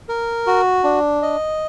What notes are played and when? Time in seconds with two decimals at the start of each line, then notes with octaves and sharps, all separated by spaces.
0.09 A#4
0.47 F#4
0.84 D4
1.22 D#5